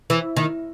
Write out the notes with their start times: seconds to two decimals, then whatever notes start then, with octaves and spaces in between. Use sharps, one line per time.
0.10 E3
0.37 D#3